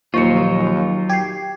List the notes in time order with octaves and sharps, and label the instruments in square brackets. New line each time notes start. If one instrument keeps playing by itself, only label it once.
[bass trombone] D#2 [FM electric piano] A#2 F3 [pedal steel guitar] F#3 D#4 F4 [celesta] C#6 C#7
[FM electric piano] G4 [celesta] G#6 C7